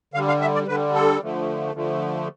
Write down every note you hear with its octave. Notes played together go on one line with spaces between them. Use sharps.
D3 G3 F5
F5
E5
D5
D3 G3 B4
A4
D3 F3 A3
D3 F3 A3